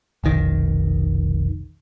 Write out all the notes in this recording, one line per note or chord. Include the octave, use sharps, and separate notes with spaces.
F1 B1 D#3